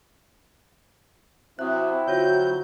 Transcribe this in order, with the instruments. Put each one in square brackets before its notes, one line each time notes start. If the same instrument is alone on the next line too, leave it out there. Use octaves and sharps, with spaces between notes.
[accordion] C3 F#3 [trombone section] C4 E4 [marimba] E5 D#6 [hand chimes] F#6
[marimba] D3 F#4 [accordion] F#3 G6 [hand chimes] F4 C#5